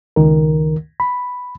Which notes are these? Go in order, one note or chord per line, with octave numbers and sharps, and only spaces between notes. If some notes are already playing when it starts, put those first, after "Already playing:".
C#2 D#3 A#4
B5